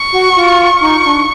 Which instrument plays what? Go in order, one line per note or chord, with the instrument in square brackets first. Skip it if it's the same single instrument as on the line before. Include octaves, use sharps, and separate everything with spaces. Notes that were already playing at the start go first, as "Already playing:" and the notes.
Already playing: [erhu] C#6
[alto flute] F#4
F4
[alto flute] D#4 [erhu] C#6
[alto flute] D4